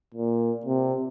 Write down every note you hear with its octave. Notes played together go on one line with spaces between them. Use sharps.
A#2
C3